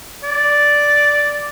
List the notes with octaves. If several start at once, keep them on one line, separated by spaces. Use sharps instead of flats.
D5